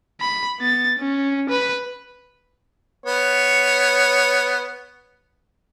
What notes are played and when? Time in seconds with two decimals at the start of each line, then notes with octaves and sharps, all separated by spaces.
0.21 B5
0.59 B3 A6
0.99 C#4
1.49 B4 B5
3.06 B3 C#5